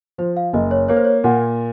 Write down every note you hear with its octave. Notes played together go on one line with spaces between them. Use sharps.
F3 C5
F5
F#1 D#5
C#5
A#3 C#5
C5
C#5
A#2 F#5